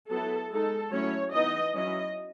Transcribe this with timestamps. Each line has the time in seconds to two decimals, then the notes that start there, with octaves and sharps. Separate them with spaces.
0.10 F#3 B3 E4 A4
0.51 G#3 D#4 A4
0.92 F#3 A3 C#4 E4 C#5
1.33 E3 B3 D#4 D#5
1.75 F#3 C#4 E4 D#5